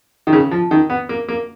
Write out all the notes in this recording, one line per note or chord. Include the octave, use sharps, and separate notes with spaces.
D#3
C#3
F3
D#3
B3
A#3
A#3